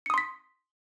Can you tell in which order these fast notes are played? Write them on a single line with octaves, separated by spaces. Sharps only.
C#7 D#6 C6 B6